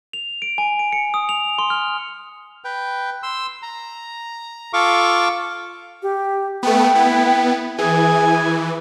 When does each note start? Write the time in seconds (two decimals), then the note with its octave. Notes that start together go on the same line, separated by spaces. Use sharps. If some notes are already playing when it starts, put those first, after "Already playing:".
0.13 F7
0.42 D7
0.58 G#5
0.79 D7
0.92 C#7
1.14 D#6
1.29 F7
1.58 C6
1.70 F6
2.64 B4 G5
3.23 C6 E6
3.62 A#5
4.73 F4 A4 F5 C#6 D6
6.02 G4
6.63 A3 B3 G5
6.95 B3 E4
7.78 E3 G#4 G#5